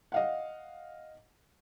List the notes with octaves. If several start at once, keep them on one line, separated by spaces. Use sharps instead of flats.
D#5 F5 F#5